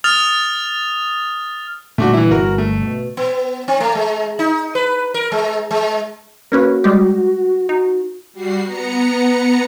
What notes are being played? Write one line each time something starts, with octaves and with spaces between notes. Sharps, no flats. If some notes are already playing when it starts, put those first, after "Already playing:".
D#6 F6 A6 F7
A#2 D3 G3 A3 D4 F#4
E3 E4
G1 F#4 A#4
A3
B2
B3
C4
A3
G#3
D#4
B4
A#4
G#3
G#3
A#3 C#4 F#4 B4
G3 G#3 G4
D#4 F#4
G3 F#4 C7
B3 A#5 C#7